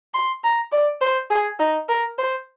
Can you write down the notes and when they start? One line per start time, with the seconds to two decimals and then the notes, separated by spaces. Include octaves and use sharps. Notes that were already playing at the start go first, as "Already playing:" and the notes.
0.14 C6
0.44 A#5
0.72 D5
1.01 C5
1.30 G#4
1.59 D#4
1.89 A#4
2.18 C5